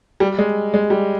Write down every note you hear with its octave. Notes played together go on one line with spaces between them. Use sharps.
G3
G#3
G#3
G3